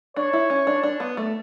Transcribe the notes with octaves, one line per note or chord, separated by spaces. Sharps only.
D4 C#5
E4
C#4
D4
D4
B3
A3